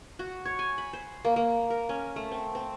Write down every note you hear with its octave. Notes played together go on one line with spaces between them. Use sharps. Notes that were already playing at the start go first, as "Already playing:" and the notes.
F#4
C#5
G#5
B5
C5
A#3
A#3
A#4
C#4
A3
C4
C4